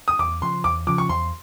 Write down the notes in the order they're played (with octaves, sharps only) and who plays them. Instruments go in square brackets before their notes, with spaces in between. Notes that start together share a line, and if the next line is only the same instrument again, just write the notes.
[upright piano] D#6
[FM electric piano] E2 [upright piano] D6
[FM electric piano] C#3 F3 [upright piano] C6
[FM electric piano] E2 [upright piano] D6
[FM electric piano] C#3 F3 [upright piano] D6
[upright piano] C#6
[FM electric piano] E2 [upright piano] C6